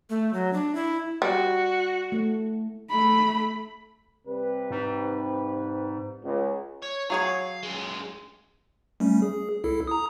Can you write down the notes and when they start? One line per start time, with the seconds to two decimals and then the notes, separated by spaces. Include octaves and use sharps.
0.10 A3
0.34 F#3
0.53 D4
0.75 E4
1.22 G3 F#4
2.12 A3
2.90 A3 B5
4.27 C3 G3 B4
4.71 G#2
6.22 C#2 G#3
6.82 C#5
7.10 F#3 G#4 C#5 F5
7.63 F#2 G#3
9.00 G3 A3 C#4
9.22 G#4
9.64 C2 E4 A4
9.87 A#5 D#6